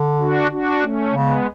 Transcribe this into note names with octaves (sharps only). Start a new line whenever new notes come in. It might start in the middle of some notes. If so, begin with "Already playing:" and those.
Already playing: D3
D4 F#4
D4 F#4
A3 C#4
C#3 G#3 B3